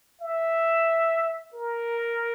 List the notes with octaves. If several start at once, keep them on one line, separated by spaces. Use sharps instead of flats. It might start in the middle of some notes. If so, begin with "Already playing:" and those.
E5
A#4